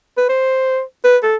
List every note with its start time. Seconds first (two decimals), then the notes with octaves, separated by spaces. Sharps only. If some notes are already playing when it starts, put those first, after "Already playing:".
0.17 B4
0.29 C5
1.04 B4
1.23 A4